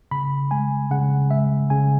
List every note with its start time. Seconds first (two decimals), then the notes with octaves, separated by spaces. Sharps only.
0.11 C#3 B5
0.51 G#3 G#5
0.91 C#3 F#5
1.31 G#3 E5
1.70 C#3 G#5